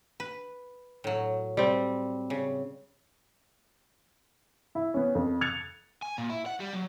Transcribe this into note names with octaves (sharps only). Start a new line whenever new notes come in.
B4
A2 F#3
G3 C4
C#3
E4
B3 C#4
F2
F#6 G#6 A6 C#7 F7
G#5
A#2
E4
F#5
G3
F#3